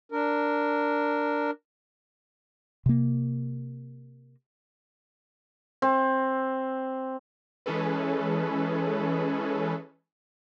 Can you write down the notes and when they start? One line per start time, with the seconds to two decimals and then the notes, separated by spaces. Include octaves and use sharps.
0.12 D4 A#4
2.86 C3 A#3
5.82 C4
7.66 E3 G#3 C#4 G#4 A4 B4